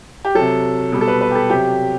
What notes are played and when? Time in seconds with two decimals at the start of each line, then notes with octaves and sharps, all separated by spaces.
0.25 G4
0.35 C3 F#3 A4
0.92 B2 G3
1.01 A4
1.08 B4
1.21 B4
1.31 G4
1.35 A4
1.50 C3 F#3 G4